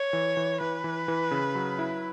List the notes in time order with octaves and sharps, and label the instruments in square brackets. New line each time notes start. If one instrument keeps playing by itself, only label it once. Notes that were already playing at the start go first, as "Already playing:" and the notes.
Already playing: [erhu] C#5
[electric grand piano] E3
E3
[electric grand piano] E3 [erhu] B4
[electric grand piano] E3
E3
C#3
F#3
E4